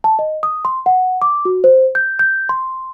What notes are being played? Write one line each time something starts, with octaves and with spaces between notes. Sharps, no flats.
A5
D#5
D#6
C6
F#5
D6
F#4
C5
G6
G6
C6